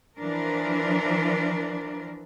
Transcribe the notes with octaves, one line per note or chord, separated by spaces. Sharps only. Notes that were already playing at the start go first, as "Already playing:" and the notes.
E3 F3 D4 A#4